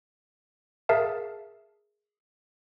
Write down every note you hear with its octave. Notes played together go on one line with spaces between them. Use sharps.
G#4 A#4 E5 F5 A5